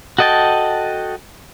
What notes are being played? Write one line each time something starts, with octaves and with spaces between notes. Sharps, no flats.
F#4 A4 D#5 G5 A5